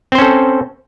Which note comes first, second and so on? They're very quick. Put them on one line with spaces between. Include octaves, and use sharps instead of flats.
C4 C5 C#4 A4